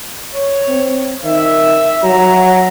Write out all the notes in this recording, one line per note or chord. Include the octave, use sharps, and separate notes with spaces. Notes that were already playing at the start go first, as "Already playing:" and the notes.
C#5
C4
D#3 E5
F#3 A#5